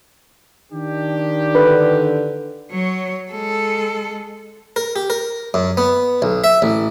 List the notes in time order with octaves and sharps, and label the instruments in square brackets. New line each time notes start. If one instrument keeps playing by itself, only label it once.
[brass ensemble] D#3 D4 G4
[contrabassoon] D3 [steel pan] B4
[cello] F#3 C#5
G#3 A4
[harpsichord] A#4
G4
A#4
F#2
B3
B1
E5
A1